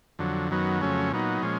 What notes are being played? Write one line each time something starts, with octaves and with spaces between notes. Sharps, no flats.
F2 D3 F#3
F#2 D#3 F#3 B3
F2 C#3 F#3 A3 C#4
A#2 F#3 B3 D#4
A#2 F3 G#3 C#4